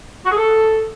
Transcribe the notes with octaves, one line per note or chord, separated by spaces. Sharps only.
F#4
G#4
A4